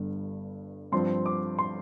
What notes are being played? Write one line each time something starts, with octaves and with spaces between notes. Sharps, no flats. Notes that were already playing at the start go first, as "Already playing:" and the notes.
Already playing: G1 G2 D3
G2 F3 C4 C6
D6
C6